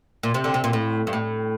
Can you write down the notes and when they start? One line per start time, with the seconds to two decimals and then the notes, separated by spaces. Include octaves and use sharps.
0.23 A#2
0.34 C3
0.44 D3
0.54 C3
0.64 A#2
0.73 A2
1.07 G2
1.13 A2